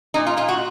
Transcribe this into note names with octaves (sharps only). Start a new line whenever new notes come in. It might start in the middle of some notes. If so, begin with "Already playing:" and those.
A#2 D#4
F4
A#2 F4
F#4